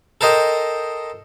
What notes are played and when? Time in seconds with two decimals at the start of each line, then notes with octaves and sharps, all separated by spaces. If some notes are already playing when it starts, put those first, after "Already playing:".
0.21 A4 A#4 C5 D#5 G5